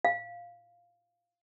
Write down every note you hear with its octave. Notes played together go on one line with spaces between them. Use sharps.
F5